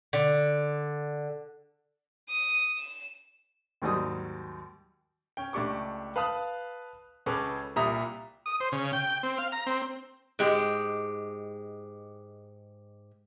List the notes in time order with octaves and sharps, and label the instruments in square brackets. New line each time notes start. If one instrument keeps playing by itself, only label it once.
[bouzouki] D3
[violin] D#6
E7
[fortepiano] D#2 G#2 F#3 G3 D#6
[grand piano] C#4 G5
C#2 A3 D4 G4 C#6 D6
B4 F5 A5 D#6 F#6
C#2 C#4 G#4 A4 B4 D6
C2 A#2 G4 E5 A#5 D#6
[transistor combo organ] D#6
C5
C#3
G5
C4
F5
A#5
C4
[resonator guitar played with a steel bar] G#2 G#3 G4